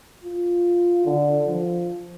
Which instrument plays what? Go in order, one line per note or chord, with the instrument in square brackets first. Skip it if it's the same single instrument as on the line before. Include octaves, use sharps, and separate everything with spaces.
[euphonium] F4
D3
F3